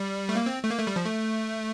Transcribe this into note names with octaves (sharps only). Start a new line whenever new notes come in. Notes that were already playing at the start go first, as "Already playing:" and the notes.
Already playing: G3
A3
A#3
C4
A3
A#3
A3
G3
F3
A3